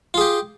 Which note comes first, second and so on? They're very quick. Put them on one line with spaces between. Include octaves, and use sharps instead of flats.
F4 G#4 G4